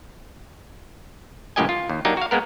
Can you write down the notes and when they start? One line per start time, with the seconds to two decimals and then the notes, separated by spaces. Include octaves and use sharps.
1.56 C#2 F#2 A2 G4 D#5 G#5
1.69 F4
1.89 D#2
2.05 F#3 A#3 D4 D#4 G4
2.17 F#4 F5
2.31 G#3 A#3 B3 A#4